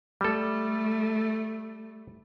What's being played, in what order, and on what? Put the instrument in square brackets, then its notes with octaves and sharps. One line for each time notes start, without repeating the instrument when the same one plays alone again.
[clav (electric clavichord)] G3 A4 [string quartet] A3